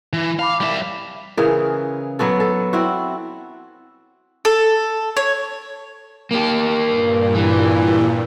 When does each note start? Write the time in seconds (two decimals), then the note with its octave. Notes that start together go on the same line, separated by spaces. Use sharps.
0.13 E3
0.39 F5 A5 B5 D6
0.60 G3 E5
1.37 C#3 E3 G#4 A#4
2.19 F#3 B3 F#4 A4
2.40 A4
2.73 C4 E4 F#4
4.45 A4
5.17 C#5
6.31 A#3 G4
6.84 G2 A#2
7.35 E3